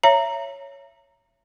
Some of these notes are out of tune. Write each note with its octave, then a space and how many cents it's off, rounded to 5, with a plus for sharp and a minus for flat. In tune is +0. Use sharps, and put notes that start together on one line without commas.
C#5 +0 E5 +30 A#5 -5